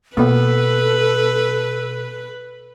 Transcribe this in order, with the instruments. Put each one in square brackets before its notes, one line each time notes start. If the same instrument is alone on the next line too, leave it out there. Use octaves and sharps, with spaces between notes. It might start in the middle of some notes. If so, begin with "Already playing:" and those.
[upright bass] B2 [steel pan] A#3 B3 [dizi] A4 [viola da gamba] B4